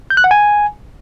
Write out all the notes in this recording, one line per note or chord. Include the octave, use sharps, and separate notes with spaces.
G6
F#6
F#5
G#5